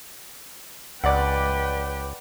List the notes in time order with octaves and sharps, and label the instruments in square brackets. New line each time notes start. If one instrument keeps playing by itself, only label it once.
[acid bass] C#2 [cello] B4 G5 [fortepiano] D5 F#5